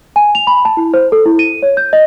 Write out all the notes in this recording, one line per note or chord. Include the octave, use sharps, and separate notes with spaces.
G#5
F7
B5
A5
E4
C5
A4
E4
D#7
C#5
G6
D#5